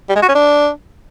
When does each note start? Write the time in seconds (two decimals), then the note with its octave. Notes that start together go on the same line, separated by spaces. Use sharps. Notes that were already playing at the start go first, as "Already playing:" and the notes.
0.09 G3
0.16 G#3
0.22 F#4
0.28 C#4
0.35 D4